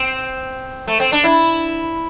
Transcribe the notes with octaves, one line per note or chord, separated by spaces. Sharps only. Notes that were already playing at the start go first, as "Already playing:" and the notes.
Already playing: C4
A3
C4
D4
E4